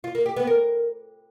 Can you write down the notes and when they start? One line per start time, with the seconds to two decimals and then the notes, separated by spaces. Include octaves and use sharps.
0.04 F4
0.15 A#3
0.26 G4
0.36 B3
0.47 A#4